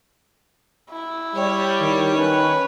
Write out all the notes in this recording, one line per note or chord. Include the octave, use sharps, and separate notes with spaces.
E4
G3 C#5
D#3
C#4 B4